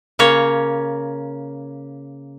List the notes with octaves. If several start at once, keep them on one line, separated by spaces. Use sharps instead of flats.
C#3 A#3 C#5